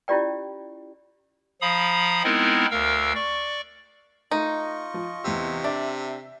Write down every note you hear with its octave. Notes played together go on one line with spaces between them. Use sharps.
C#4 E4 F4 G4 D5 G5
F3 F5 A#5 B5 D#6
G#3 B3 C4 D#4 E4 A#4
D2 A#4 F5 E6
D5 C#6
A3 D#4 F4 D#5 C#6
F3
E2 C3 E6
D4 E5